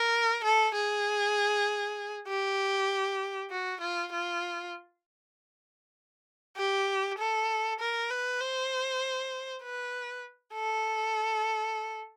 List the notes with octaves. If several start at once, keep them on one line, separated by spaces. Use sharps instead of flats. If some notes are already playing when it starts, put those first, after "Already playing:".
Already playing: A#4
A4
G#4
G4
F#4
F4
F4
G4
A4
A#4
B4
C5
B4
A4